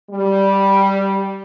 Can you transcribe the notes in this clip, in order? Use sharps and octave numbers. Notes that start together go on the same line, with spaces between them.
G3